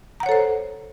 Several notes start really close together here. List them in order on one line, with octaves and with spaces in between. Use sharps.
A#5 F#5 C#5 A4 C5